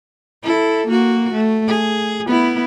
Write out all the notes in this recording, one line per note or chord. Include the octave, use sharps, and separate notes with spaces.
E4 A4
A#3 F#4
A3
G#4
B3 E4